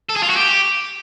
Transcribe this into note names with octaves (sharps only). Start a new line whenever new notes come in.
A4
G#4
F4
F#4
G4